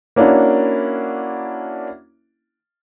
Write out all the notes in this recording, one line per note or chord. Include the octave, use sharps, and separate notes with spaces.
A#3 C#4 D4 E4 F#4